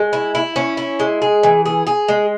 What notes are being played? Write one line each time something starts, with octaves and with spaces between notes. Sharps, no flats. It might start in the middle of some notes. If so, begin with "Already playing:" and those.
Already playing: G#3
E4
E4
C#4
E4
G#3
G#4
E3
G#4
G#4
G#3